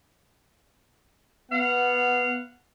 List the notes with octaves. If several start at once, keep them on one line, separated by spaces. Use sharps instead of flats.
B3 F5 F#5